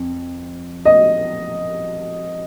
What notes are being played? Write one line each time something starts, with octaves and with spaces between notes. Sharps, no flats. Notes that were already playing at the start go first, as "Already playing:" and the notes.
Already playing: F2
D#5